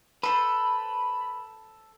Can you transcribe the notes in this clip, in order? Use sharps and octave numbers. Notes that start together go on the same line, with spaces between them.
A4 B4 C5 B5